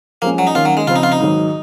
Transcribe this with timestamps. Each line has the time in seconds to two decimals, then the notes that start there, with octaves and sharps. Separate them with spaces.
0.22 F3 G#3 A#3 C#4
0.38 F#3
0.47 D#4
0.55 D#3 A#3 C#4 F4
0.65 F#3
0.77 G#3
0.87 C#3 F3 C4 F4
0.96 D#4
1.03 F4
1.12 D#4
1.20 G#2 D#3 F#3